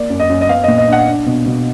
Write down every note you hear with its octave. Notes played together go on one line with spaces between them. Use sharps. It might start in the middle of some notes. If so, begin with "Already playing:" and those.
Already playing: A#3 D5
F#2
D#5
F#2
D#5
B3 F5
A#2 D#5
D#5
D4 F#5
D4
B2
B2